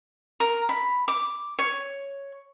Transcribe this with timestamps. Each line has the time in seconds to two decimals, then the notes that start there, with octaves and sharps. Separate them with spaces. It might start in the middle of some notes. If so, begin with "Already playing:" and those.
0.40 A#4
0.69 B5
1.08 D6
1.59 C#5